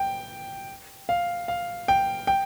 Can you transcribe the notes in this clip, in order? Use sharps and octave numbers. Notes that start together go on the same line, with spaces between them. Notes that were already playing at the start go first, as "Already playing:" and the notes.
Already playing: G5
F5
F5
G5
G5